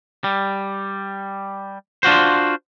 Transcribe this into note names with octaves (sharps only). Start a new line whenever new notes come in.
G3
D4 F4 F#4 C5